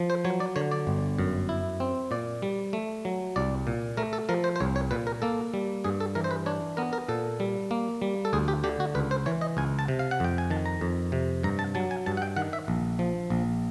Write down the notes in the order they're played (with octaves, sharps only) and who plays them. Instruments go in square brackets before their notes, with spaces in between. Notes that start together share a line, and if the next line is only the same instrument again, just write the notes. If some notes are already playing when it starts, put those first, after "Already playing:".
Already playing: [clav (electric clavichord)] F3
C5
F#3 C#5
D5
D3 C#5
D5
G1
F#2
E4
C4
A#2 D5
G3
A3
F#3
C2 D5
A#2
A3 A#4
A4
F3 A#4
C5
C5
C2 C#5
C#5
A#2 B4
A#4
A#3 A4
G3
G2 G#4
A4
E3 A#4
C5
B4
D4 C#5
B3 A#4
A#4
A#2 A4
G3
A#3
G3
A4
D2 G#4
G4
D3 G4
F#4
C#2 B4
C5
E3 C#5
D#5
C#2 G#5
A5
C3
F5
F#5
F2 G5
G#5
D#3 A5
A#5
F2
C3
G2 A#5
A5
F#3 A5
G#5
G2 A5
F#5
G5
D#3 F#5
E5
A#1
F3
A#1